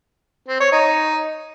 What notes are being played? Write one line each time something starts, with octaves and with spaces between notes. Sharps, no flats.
C4
C#5
D#4